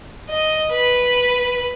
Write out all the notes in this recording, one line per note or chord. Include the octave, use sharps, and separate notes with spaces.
D#5
B4